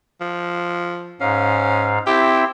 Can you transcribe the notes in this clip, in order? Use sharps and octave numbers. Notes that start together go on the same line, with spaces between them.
F3
G#2 C#4 F5
C4 E4 G4 E5